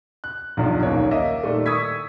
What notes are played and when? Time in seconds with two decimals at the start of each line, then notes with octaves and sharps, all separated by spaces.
0.24 F#6
0.57 B1 E2 G2 F3
0.83 D#1 B1 D#3 A#3 C#5
1.11 A#3 D#5 E5
1.44 A#2 D#3 G3 A3
1.66 C#6 D#6 E6 G#6 B6